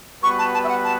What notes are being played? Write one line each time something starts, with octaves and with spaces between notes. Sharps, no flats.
G3 B3 F#4 B4 C#6
A5
A5
E5
F#5
A5